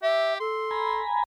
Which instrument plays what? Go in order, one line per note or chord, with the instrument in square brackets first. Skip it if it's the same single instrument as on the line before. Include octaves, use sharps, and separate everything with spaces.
[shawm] G4 [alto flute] E5
[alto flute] A4 [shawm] C6
[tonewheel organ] G#5 A#5 B5